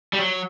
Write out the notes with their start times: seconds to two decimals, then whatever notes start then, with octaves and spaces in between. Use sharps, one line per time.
0.13 G3
0.19 F#3